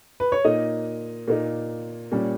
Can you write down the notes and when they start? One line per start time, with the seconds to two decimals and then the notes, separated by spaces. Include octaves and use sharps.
0.20 B4
0.32 C#5
0.45 A#2 A#3 D#4 D#5
1.28 A#2 A#3 D#4
2.12 A#2 G3 C#4